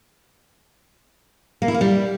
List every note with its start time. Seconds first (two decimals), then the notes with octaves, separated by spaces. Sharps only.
1.62 A#3
1.68 E4
1.74 A#3
1.81 G3